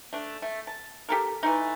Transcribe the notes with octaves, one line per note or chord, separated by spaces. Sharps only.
A3 D4
A3
A5
G4 A4 A#4
E3 A3 D#4